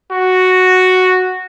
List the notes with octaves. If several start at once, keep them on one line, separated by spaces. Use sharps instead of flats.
F#4